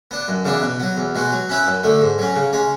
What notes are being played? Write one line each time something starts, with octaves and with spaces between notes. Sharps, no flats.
B3 D4
F#2
C#3 E3 B3 D4
B2
F#3 B3
E2
B2 G#3 B3 F#4
F#3
C#4 E4 B4
F#2
D3 A3
G#2
F#3 C#4
C#3
G#3 C#4